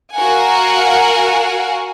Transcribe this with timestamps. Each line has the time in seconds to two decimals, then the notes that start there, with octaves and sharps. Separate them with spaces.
0.13 F#4 A#4 F5 F#5 G#5